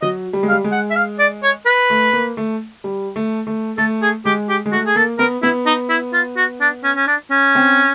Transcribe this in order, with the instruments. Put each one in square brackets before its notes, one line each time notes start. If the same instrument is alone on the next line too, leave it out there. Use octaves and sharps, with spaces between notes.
[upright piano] F#3 [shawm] D#5
[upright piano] G3
G#3
[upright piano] G3 [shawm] F5
[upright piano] G#3
[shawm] F#5
E5
F5
D5
C#5
B4
[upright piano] A3
A#3
A3
G3
A3
A3
[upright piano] A3 [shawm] A4
[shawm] G#4
[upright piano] G#3 [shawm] G4
[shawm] G4
[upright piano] G#3
[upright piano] A3 [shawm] F#4
[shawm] G#4
[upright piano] A#3 [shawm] A4
[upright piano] B3 [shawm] A#4
[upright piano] B3 [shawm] E4
[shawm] D#4
E4
F4
F#4
D4
C#4
C#4
D4
C#4
[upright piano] C4